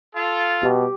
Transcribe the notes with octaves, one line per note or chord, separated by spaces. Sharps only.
F4 A4
B2 G4